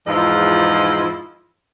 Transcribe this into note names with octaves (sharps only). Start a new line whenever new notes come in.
E2 G#2 F3 E4 F4 D#5